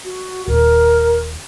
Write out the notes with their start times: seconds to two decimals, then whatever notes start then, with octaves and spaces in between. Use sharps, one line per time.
0.04 F#4
0.48 D#1 A#4